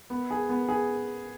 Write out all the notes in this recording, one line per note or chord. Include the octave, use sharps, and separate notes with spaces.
B3
G#4
B3
G#4